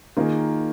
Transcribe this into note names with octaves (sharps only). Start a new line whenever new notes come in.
D#3 A#3 F4 G#4